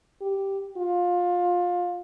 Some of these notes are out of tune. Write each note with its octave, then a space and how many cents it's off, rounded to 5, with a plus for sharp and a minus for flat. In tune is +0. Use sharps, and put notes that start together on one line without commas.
G4 -5
F4 +20